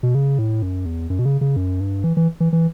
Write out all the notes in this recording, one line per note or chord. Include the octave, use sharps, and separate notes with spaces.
B2
C#3
A2
F#2
E2
F#2
B2
C#3
C#3
F#2
G2
E3
E3
E3
E3